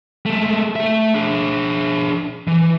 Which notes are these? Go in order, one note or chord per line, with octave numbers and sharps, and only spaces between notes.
G#3 A3
A3 E5
D4 G#4
E3